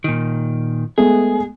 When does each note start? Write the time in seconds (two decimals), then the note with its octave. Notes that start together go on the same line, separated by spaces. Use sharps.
0.04 A#2 D#3
0.98 G#3 A3 B3 G#4